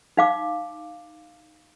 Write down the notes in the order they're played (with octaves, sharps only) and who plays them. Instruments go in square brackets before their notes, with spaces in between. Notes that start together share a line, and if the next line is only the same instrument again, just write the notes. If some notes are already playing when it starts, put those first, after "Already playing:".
[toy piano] D#4 F5 D6